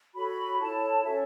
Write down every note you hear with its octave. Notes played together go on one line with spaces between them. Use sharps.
F#4 A4 C#5 B5
E4 A4 C#5 A5
C#4 F#4 A4 C#5 E5